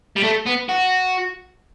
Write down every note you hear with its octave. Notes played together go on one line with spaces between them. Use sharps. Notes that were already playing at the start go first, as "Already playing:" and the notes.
G3
A3
B3
F#4